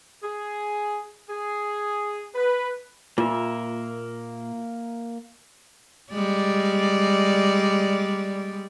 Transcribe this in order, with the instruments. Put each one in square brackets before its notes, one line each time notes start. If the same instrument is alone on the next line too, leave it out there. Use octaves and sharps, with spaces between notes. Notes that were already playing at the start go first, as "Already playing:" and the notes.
[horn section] G#4
G#4
B4
[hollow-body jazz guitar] A#2 [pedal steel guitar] A#3 A#4 E5 [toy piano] F4
[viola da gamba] G3 G#3 D5